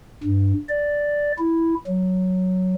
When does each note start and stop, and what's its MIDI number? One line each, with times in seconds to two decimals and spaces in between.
0.23 0.53 43
0.69 1.32 74
1.38 1.75 64
1.87 2.75 54